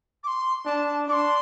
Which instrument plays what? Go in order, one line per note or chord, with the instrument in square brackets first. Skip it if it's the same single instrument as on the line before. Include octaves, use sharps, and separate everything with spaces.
[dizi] D6
C6
[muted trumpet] D4 [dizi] A5
[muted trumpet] D4 [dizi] C6 D6